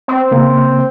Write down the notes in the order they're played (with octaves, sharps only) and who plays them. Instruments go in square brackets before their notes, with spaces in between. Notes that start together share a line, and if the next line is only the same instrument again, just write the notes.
[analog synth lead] C4
[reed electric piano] C#3 A#3